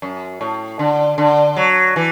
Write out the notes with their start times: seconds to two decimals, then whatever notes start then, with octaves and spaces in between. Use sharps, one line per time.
0.02 F#2
0.41 A2
0.79 D3
1.18 D3
1.56 F#3
1.96 E3